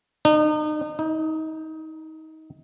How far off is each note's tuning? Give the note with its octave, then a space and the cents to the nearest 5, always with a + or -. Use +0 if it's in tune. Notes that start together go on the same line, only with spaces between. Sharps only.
D#4 -35
D#4 +25